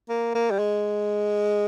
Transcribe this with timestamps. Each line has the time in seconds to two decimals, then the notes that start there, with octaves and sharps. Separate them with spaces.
0.09 A#3
0.35 A#3
0.51 G3
0.59 G#3